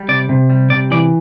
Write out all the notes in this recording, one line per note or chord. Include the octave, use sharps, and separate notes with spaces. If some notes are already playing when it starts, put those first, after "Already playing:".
Already playing: G3
C3 D5
C3
G3
C3 D5
E3 D5